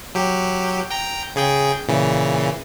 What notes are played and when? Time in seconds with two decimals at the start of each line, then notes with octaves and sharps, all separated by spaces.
0.15 F#3 G4
0.90 G5 A#5
1.35 C#3 G#4 G5
1.88 A#2 C#3 E3